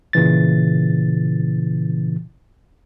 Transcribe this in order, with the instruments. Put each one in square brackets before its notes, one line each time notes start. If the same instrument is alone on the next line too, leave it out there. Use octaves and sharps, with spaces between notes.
[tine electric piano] A#2 C#3 E3 A6